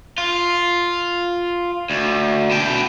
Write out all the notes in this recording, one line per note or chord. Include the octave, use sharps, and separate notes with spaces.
F4
D2
B2 G5